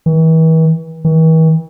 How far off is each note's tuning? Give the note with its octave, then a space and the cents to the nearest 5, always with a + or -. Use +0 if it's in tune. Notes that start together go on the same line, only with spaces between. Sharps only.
E3 -40
E3 -45